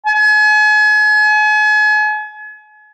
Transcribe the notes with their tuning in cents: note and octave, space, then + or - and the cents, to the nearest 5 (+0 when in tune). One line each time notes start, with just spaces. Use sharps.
G#5 +40